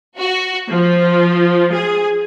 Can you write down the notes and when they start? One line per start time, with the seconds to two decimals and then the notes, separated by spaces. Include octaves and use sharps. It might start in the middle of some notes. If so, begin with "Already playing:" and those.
0.17 F#4
0.70 F3
1.74 G#4